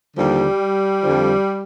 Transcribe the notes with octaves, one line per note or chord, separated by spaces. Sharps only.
D#2 D3 F3 G3
F2 D3 F3